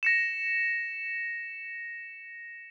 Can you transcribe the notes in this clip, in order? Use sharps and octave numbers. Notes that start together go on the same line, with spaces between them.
A#6 C#7 E7